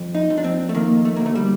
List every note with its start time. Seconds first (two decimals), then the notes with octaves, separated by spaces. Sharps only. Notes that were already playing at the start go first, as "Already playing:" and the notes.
Already playing: F2
0.15 D#4
0.30 F2
0.38 D4
0.44 C4
0.69 A3
0.74 D#3 A#3
1.05 A3
1.16 D2 A#3
1.26 A3
1.35 G3